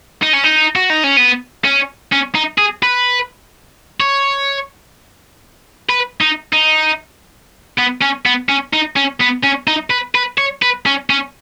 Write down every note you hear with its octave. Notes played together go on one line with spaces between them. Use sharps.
D#4
C#4
D#4
F#4
D#4
C#4
B3
C#4
C#4
D#4
G#4
B4
C#5
B4
D#4
D#4
B3
C#4
B3
C#4
D#4
C#4
B3
C#4
D#4
B4
B4
C#5
B4
C#4
C#4